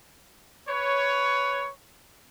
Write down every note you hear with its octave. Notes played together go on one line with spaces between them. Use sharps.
B4 C#5